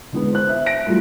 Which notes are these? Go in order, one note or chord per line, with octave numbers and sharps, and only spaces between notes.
D3 G#3 B3
C5 F#6
E5
E5 A#6 D7
E3 F#3 G3 A3 F4